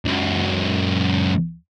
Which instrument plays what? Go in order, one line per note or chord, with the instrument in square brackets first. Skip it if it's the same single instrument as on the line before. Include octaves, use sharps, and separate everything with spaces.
[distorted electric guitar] C#2 F#2